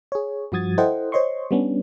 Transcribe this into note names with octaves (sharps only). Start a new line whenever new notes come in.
G#4 C#5
G2 F3 F#4 D#6 G#6 A6
E4 A4 C5 D#5 F#5 G5
C5 C#5 D#5 C6 C#6
G3 B3 C#4 D4